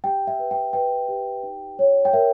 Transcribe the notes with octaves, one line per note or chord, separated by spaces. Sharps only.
G4 G5
E5
B4
G5
B4 G5
G4
D#4
C#5
G5
A#4 E5